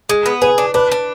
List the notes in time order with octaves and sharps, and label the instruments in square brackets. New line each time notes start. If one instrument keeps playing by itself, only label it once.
[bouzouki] G#3
B3
[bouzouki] G#4 [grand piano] B4
[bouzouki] D4
[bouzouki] D4 [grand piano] B4
[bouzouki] D4